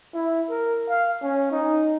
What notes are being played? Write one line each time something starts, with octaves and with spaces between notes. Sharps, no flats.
E4
A#4
F5
C#4
D#4